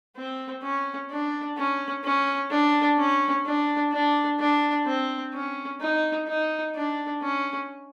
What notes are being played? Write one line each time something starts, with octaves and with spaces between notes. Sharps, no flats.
C4
C#4
D4
C#4
C#4
D4
C#4
D4
D4
D4
C4
C#4
D#4
D#4
D4
C#4